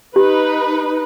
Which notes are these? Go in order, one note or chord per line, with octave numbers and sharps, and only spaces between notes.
D#4 G4 B4